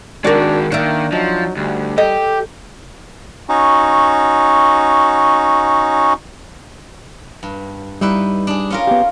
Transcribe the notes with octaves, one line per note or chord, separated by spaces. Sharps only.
D#3 G#3 D4 F#4 A#4 D5
D#3 A#3 D4 E5
F3 F#3 D#4
D2 G3
G4 A4 D#5
C#4 D#4 F#4
G2
G3 D#4 E4 B4
D4 G#4
C#4 F4 A#4
B3 G4